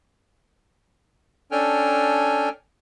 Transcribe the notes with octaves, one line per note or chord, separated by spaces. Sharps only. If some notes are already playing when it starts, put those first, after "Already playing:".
C#4 D4 A4 G5 G#5 F6